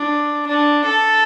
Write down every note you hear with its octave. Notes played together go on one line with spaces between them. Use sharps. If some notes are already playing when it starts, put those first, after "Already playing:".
Already playing: D4
D4
A4